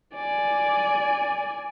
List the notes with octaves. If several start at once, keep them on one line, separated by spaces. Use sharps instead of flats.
D5 G#5